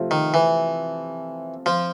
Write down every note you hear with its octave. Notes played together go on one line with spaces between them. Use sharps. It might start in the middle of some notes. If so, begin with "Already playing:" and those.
Already playing: C3 F3 A3 C4 F4
D#3
E3
F3